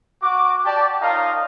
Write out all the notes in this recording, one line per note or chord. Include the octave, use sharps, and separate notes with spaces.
F#4 D6
G4 D5 A5
D#4 F4 A#4 C#5 D#5 F5